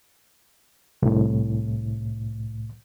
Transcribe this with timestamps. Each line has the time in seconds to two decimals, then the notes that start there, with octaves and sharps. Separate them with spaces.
1.02 C2 A2